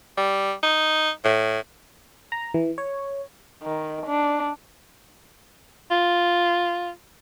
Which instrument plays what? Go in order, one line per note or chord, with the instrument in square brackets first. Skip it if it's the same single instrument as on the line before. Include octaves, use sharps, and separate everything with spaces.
[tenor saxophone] G3
D#4
A2
[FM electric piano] A#5
E3
C#5
[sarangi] D#3
D4
[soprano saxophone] F4